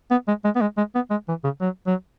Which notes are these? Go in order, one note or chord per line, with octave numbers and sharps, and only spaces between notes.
B3
G#3
G#3
B3
G#3
G#3
B3
G#3
E3
C#3
F#3
F#3